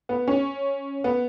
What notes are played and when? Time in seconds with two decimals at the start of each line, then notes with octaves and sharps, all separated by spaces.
0.09 B3
0.28 C#4
1.04 B3